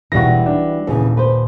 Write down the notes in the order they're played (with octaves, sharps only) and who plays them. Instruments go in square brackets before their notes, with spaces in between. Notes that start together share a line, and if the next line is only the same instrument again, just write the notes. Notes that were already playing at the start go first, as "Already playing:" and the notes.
[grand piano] E1 A#6 [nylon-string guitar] E3 G3 F#4
[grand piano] D4
[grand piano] D#1 [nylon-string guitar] C#3 E3
[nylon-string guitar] B4 C5